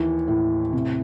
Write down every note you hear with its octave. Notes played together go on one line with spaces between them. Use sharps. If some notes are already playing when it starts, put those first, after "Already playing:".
Already playing: D#2 E3
A2
C3